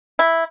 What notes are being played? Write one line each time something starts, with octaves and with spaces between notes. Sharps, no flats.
E4